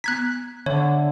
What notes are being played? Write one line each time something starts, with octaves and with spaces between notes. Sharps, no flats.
B3 A#5 F#6 G#6 B6
D3 C#5 E5